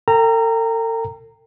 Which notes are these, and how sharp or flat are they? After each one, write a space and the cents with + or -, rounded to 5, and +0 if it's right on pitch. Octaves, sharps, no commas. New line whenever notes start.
A4 +45 G5 +10 A#5 -15